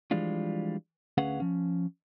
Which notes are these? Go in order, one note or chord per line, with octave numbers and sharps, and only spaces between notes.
E3 F3 G3 G#3 D4 F4
D2 C#4 G#4 B4 F5 F#5
F3 C#4